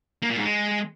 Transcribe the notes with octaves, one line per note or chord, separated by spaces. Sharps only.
A#3
A#2
G#2
G#3